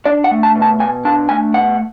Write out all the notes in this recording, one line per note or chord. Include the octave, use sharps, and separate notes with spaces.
D4 D5
F#5
A3
A5
B2
A5
B2 G#5
D4 A5
A3 G#5
B2 F#5